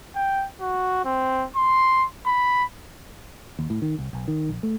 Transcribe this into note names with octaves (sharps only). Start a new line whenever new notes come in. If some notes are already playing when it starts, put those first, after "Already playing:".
G5
F#4
C4
C6
B5
D#2
A2
D#3
C2
B1
D#3
A#1
A3